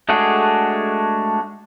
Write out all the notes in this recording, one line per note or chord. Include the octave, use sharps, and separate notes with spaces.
G#3 A3 D4 F#4 G#4